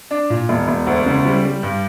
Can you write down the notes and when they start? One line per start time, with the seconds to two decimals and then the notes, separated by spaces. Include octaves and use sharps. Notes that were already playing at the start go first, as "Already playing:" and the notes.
0.11 D4
0.30 A#2
0.49 E1
0.68 E1
0.87 D2
1.06 C#3
1.25 G3
1.44 G3
1.63 G2